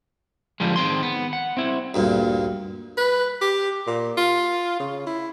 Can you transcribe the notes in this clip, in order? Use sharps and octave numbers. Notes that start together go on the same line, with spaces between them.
D3 F3 G3 G#3
D#3 C4 G#4 C6
B3
F#5
C4 E4
D2 G2 A#2
B4
G4
A#2
F4
C#3
E4